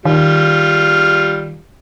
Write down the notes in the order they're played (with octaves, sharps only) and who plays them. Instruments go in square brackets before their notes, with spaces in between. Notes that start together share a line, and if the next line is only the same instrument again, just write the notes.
[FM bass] D#3 [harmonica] G3 F4